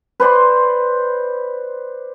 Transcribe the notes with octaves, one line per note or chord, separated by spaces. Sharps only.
B4 C5 D5 C6